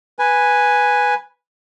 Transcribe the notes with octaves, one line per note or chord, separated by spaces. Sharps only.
B4 G#5